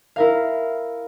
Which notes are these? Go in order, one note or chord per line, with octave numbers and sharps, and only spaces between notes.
E4 A#4 F5